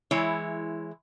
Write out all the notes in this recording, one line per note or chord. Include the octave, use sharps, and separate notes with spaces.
E3 G#3 E4 C#5